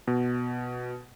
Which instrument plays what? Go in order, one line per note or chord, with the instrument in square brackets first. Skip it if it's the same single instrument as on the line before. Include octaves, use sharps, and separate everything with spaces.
[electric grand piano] B2